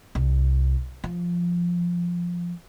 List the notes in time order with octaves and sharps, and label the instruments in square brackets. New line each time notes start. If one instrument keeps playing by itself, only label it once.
[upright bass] C2
F3